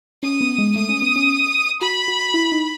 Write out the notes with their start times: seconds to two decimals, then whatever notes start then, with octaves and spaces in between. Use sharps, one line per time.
0.23 C#4 D#6
0.41 B3
0.58 G#3
0.75 A3 D#6
0.89 C#4
1.02 B3
1.16 C#4
1.81 F#4 B5
2.08 F#4
2.34 E4
2.52 D#4